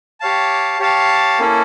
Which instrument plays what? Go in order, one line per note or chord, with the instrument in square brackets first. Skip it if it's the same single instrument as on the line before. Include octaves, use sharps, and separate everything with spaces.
[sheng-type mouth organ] G4 C#5 F5 A5
G4 C#5 F5 A5
A#3 C#4 E4 A4